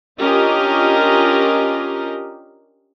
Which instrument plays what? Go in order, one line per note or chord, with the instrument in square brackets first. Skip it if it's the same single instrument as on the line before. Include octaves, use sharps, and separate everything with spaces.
[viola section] C#4 D4 F4 G4 A#4 D#5